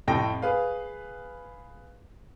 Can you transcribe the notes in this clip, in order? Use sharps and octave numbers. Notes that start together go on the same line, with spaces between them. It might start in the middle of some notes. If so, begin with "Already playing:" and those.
F2 A2 G4 A4 G5 A#6
G#4 B4 F5